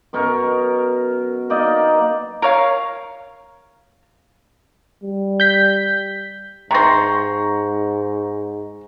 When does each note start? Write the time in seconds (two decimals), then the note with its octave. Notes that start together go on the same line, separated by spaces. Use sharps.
0.13 F#2 B2 A#4 C#6
1.50 A#3 D#4 D5 D#5
2.42 A#4 C#5 F5
5.04 G3
5.40 G6 B6
6.71 G#2 C3 C5 A#5 C#6 A#6